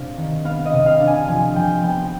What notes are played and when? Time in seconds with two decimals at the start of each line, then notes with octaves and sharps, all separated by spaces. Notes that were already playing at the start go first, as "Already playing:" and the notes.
Already playing: C3 D4 F5
0.17 D#3
0.44 B3 F5
0.65 D#5
0.73 C3
0.86 F5
1.00 D4
1.07 G#5
1.28 F3 G#5
1.56 F3 G5
1.83 B3 G5